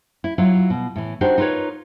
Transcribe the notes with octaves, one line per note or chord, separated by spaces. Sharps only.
E4
F#3 E4 F4
B2
A2 E3
D4 D#4 F#4 G4 C5
D#4 F4 A#4 B4 C#5